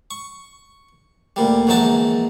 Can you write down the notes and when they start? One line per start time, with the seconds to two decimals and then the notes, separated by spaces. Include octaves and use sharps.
0.11 C#6
1.36 D2 A#2 G3
1.67 A#1 E2 F#3 G#3 D#4 A5